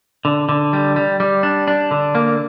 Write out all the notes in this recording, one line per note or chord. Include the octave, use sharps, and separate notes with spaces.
D3
D3
G3
G3
G3
D4
D4
D3
A#3